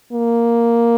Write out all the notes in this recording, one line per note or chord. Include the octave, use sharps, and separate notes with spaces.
A#3